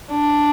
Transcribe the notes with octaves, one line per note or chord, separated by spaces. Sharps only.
D4